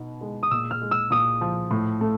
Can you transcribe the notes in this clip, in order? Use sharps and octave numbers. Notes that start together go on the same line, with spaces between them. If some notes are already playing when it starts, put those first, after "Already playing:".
Already playing: B2 B3 D#4
G#3
D#6
A#2 E6
F6
G#3
E6
A#2 D#6
F3
A2
A3